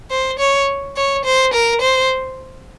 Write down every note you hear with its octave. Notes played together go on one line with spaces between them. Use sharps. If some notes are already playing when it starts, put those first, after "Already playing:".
C5
C#5
C#5
C5
A#4
C5